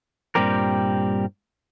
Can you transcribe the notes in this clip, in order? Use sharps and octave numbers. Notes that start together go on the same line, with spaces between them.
G2 A#2 G3 C4 G4 A#4